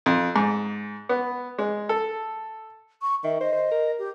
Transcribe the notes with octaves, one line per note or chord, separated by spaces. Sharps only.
F2
G#2
B3
G#3
A4
C#6
D#3 E5
C5 D#5
C5
A#4
G4